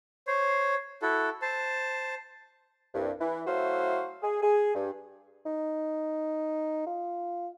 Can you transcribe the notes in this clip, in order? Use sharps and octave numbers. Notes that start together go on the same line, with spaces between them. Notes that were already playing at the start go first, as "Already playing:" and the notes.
C5 C#5
E4 F#4 A4
C5 A5
C2 G2
E3
F#3 A3 E4 F#4 C5 F5
G#4
G#4
G2
D#4
F4